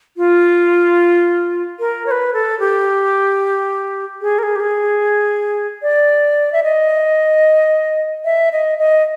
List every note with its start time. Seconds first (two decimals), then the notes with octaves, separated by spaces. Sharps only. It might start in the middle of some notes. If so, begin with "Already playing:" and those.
0.17 F4
1.80 A#4
2.06 C#5
2.11 B4
2.33 A4
2.60 G4
4.22 G#4
4.39 A#4
4.43 G#4
4.56 G4
4.60 G#4
5.82 D5
6.53 E5
6.63 D#5
8.25 E5
8.52 D#5
8.79 D#5